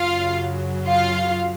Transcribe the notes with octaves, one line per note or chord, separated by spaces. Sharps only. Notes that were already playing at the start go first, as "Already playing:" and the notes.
Already playing: F#2 C#3 F#3 F4 F5
F4 F5